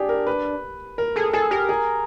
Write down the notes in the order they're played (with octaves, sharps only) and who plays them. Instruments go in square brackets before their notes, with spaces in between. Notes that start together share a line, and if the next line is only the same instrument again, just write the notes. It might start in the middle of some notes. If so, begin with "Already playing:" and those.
Already playing: [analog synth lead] D4 [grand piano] G4 G#4
[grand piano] A#4
B4
A#4
[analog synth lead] G#4 [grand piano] A4
[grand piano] G#4 [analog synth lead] A4
[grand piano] G4 [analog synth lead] A#4
[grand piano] G#4